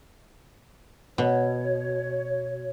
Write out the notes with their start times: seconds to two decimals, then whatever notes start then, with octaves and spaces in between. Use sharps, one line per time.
1.18 B2 C#5